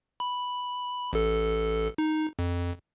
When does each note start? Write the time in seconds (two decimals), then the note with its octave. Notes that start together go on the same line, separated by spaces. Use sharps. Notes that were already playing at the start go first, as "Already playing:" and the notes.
0.20 B5
1.13 A1 A4
1.98 D#4
2.39 F2